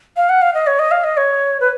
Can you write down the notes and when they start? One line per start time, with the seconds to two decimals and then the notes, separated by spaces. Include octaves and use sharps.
0.17 F5
0.29 F#5
0.42 F5
0.54 D#5
0.67 C#5
0.79 D#5
0.91 F5
1.04 D#5
1.17 C#5
1.60 B4